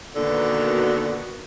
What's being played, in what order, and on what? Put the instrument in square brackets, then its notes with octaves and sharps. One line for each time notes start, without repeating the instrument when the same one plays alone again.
[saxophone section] D#2 A#2 D3 [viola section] D#3 B3 F#4